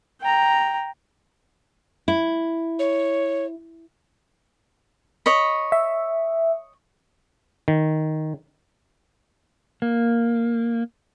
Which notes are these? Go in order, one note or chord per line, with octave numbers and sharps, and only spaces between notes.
G5 A#5
E4
C#5
C#5 D#5 B5
E5
D#3
A#3